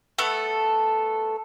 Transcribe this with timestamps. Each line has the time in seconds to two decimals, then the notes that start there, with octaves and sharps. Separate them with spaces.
0.18 A3 B3 A4